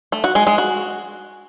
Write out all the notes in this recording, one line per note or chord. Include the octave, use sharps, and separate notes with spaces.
A3
F#4
G#3
G#3
F#4